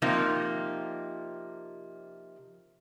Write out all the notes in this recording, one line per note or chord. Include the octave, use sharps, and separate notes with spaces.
C3 F3 A#3 D#4